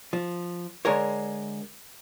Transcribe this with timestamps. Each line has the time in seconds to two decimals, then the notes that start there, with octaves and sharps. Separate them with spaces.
0.13 F3
0.85 D3 G#3 A#4 C#5